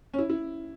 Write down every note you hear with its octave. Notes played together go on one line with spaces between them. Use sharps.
C#4
E4
E4